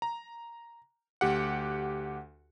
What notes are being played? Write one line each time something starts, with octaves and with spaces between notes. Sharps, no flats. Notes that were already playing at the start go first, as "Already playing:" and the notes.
A#5
D2 G4 F#5